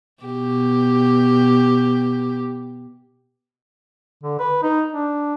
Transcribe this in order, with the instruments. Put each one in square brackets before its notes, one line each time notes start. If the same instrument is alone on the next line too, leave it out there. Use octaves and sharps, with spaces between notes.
[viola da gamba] B2 G4
[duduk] D3
B4
D#4
D4